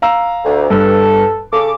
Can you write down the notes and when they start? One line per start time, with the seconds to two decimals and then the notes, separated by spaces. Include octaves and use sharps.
0.02 F5 A#5 E6
0.45 D2
0.70 G2 A4 B4
1.53 C#3 A4 D6